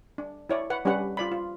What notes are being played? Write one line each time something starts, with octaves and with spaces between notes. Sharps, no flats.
D4
E4 C#5 D5
B4 F#5
G3 C#4 D4 G4 B4 F#5
F4 D5 B5
F4